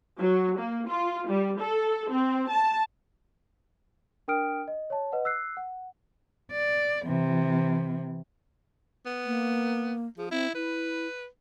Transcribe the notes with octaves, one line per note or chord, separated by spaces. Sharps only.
F#3
A#3
F4
G3
A4
C4
A5
D4 A#4 G5 D#6 F6 D7
D#5
C#5 A5
B4 D#5 F#5
E6 F#6 C7
F#5
D5
C3 E3
B3
A#3
F3 G#4
C4 E4
E4 B4